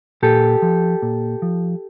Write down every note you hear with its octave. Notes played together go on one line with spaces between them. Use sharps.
A#2 G4 A4
F3
A#2
F3